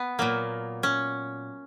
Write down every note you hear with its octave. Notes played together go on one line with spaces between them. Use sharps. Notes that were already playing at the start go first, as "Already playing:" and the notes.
Already playing: B3
A#2 F#3 A#3
C#4